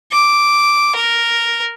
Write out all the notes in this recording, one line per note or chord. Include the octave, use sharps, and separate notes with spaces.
D6
A#4